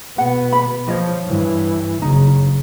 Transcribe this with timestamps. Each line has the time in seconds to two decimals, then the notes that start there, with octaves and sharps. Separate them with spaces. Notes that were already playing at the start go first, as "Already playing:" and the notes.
0.18 B2 B3 F#5
0.52 B5
0.88 F3 C#5 D#5
1.26 G2 E3
2.02 F#1 C#3 D#4